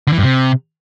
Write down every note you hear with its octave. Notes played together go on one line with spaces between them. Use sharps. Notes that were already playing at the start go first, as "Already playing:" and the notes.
D3
E3
G2
C3